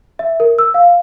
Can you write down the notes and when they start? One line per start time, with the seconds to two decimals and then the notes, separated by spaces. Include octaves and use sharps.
0.19 E5
0.40 A#4
0.59 E6
0.74 F5